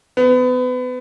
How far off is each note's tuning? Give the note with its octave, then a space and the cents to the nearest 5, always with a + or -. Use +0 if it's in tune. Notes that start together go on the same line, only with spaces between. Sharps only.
B3 +30